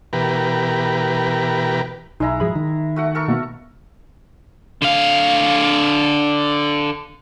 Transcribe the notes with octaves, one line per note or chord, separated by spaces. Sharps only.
B2 E3 G4 A#4 B4
B1 G#3 D#4 E4 D#5 A#5
G#2 F3 F#3 G#4 B5
D#3
A3 F#4 F#5
A4 A#4 C#6
B2 A#3 B3
D3 F5